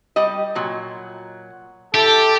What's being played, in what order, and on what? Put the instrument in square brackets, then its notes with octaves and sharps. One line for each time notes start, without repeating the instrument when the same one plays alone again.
[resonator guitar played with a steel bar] G3 G4 D#5
A#2 F#3
[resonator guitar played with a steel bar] E4 [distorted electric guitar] G4 [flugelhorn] A4